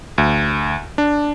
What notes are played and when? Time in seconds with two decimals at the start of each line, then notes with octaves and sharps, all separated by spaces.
0.18 D2
0.98 D4